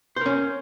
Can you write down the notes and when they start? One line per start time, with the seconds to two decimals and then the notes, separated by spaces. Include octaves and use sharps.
0.16 C5
0.21 A#4
0.26 C#4